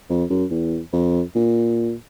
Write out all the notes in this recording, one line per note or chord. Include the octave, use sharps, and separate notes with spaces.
F2
F#2
E2
F2
A#2